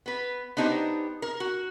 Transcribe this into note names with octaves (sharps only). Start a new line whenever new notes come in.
B3 B4
B3 D4 D#4 G4 A#4 C5
A#4
F#4